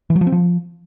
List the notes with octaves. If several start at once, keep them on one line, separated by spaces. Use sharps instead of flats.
E3
F#3
F3
C4
F3